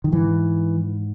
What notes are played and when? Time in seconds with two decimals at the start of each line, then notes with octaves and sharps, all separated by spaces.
0.04 D#3
0.12 G#2 E3